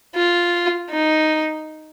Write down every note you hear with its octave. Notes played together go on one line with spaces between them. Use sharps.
F4
D#4